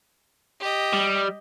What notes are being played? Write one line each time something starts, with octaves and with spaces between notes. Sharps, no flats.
G4 D#5
G3